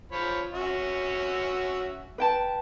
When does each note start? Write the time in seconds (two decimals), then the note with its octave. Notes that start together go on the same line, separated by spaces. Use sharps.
0.12 F3 C#5 B5
0.54 C#4 F#4 E5
2.18 B4 G5 A5